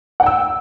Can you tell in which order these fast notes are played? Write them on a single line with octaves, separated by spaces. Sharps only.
F#5 G5 E6